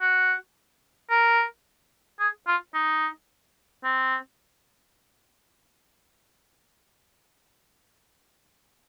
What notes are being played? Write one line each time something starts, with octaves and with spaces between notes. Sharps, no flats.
F#4
A#4
G#4
F4
D#4
C4